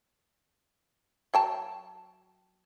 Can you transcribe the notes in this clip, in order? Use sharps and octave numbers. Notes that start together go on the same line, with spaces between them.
F#3 G5 A5